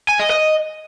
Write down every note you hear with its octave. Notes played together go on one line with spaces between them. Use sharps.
G#5
D#5
D#5